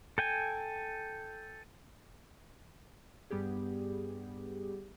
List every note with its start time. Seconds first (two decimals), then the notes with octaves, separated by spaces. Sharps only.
0.18 A4 G5 G#5
3.31 G2 G3 B3 G4 G#4